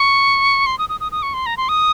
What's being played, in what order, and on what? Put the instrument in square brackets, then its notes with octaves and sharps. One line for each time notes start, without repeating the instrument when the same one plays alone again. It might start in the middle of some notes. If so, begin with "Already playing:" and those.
Already playing: [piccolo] C#6
C6
D#6
D#6
D#6
D#6
C#6
C6
A#5
C6
D#6